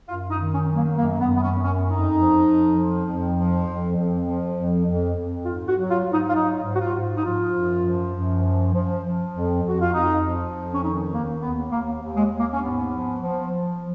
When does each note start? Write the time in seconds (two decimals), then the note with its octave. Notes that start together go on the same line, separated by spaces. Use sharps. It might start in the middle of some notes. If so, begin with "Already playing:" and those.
0.08 F#2 F4
0.30 D#4
0.38 D#3
0.52 C#4
0.68 F#3
0.75 A#3
0.97 F#2 A#3
1.20 B3
1.27 F#2
1.36 B3
1.43 C#4
1.57 F#2
1.64 C#4
1.87 F2 D#4
2.16 F3
2.46 F2
2.76 F3
3.06 F2
3.37 F3
3.66 F2
3.96 F2
4.25 F3
4.56 F2
4.85 F2
5.15 F2
5.45 G#2 F4
5.67 F#4
5.75 F#3
5.89 F4
6.05 G#2
6.12 D#4
6.28 F4
6.34 F#3 D#4
6.64 G#2
6.74 F#4
6.80 F4
6.94 G#2
7.17 D#4
7.24 F3 F4
7.54 F#2
7.84 F3
8.14 F#2
8.43 F3
8.73 F3
9.03 F3
9.33 F2
9.62 F2 F#4
9.80 F4
9.92 F2 D#4
10.23 F3
10.52 F2
10.74 C#4
10.81 D#3 D#4
11.11 D#2 A#3
11.41 D#2 B3
11.71 D#2 A#3
12.02 D#2
12.16 G#3
12.31 D#2
12.39 A#3
12.53 C#4
12.61 G#2 B3
12.91 F3
13.20 F3
13.50 F3